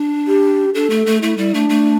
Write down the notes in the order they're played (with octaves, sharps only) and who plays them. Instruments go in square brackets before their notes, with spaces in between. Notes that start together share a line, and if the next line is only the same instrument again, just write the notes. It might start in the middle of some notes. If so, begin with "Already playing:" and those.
Already playing: [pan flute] D4
[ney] G4
[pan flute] D4 [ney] A4
[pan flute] A3
A3
[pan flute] A3 [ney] E4
[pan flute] G3 [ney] E4
[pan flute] A3 [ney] D4
[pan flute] A3